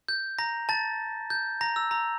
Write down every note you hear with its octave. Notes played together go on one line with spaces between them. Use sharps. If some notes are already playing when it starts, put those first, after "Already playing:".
G6
A#5 A#6
A5 A6
G6
A#5 A#6
E6
A#5